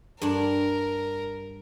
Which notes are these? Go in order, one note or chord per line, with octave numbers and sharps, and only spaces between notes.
G2 D4 A#4